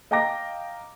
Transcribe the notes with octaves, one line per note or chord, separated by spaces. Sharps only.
D#5 F5 G5 A#5 D6 A#6